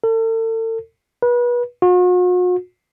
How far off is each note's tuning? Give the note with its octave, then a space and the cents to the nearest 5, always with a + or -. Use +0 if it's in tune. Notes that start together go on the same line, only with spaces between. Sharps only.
A4 +40
B4 -30
F#4 -45